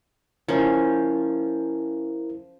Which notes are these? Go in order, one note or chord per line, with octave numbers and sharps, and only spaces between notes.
F3 C#4 E4 A#4